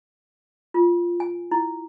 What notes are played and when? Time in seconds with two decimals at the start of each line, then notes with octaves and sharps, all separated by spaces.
0.74 F4
1.20 G#5
1.51 E4